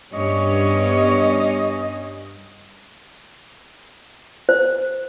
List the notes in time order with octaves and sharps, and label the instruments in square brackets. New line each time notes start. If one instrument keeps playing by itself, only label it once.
[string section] G2 C#4 [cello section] B3 C#5 [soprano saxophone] D#5
[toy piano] C5